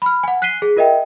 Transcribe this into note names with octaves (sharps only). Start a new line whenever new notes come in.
B5 F6
F#5 G#5
F#6 B6 C7 D#7 G7
G#4
F4 A#4 D#5 E5 G5